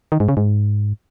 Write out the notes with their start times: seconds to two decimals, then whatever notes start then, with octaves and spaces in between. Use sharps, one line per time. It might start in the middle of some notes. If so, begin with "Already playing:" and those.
0.12 D#3
0.20 G#2
0.29 C#3
0.37 G#2